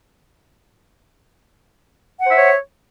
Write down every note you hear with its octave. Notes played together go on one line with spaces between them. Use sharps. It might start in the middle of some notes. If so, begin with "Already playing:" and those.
C5 C#5 E5 F#5